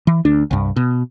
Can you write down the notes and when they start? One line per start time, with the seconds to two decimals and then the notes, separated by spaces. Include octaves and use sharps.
0.07 E3
0.25 D2 D4
0.51 C2 G2
0.76 B2